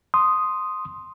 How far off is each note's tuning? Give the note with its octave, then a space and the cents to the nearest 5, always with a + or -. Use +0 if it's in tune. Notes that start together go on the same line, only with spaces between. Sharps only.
C6 +0 D#6 +0